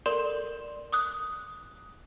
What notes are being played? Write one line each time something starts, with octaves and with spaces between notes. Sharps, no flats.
A4 A#4 D5 C6 E7 G7
D6 D#6 F#6